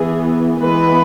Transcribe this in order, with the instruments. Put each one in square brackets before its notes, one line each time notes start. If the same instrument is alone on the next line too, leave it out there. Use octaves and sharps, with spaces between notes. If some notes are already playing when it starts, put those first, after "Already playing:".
Already playing: [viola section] E3 B3 G#4
E3 G#3 B3 B4